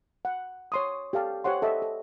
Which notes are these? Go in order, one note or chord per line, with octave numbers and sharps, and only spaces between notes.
F#5
C#5 C6 D#6
G4 A4 F5 A5
G4 C5 C#5 F#5 C6
A4 D#5 E5
A4